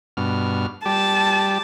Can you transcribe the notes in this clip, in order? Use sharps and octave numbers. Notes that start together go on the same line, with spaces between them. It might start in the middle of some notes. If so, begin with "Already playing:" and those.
G2 B2 F6
G3 G4 A5